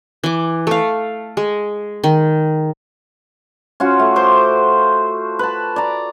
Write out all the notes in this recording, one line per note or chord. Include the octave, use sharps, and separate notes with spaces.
E3 D6
A3 F5
G#3
D#3
C#4 F4 F#4
A3
C5 C6 D6
B4 A5
D5 A#5